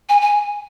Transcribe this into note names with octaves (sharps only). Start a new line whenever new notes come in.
G#5
G#5